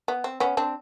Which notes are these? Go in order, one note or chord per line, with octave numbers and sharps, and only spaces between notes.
B3
C4
B3 C#4
C4 D4